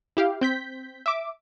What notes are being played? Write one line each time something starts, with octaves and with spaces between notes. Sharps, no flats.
E4 G4 F5
C4 G6 B6
E5 D6